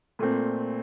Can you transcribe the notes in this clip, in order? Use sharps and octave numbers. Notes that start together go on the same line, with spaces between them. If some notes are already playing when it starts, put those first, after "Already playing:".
A#2 A3 C4